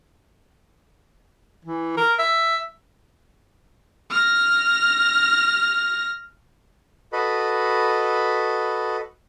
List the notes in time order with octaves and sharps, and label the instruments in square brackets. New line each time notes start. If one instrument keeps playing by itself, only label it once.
[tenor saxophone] E3
A#4
E5
[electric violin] F6 A#6
[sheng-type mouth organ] F#4 A4 B4 D#5 B5